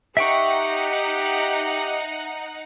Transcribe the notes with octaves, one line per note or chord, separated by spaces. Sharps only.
D#4 G4 E5 F#5 G5 C#6